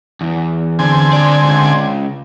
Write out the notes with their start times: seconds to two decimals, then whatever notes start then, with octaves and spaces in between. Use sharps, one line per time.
0.21 E2
0.79 D3 C4 G#5
1.13 G2 D5
1.43 C#2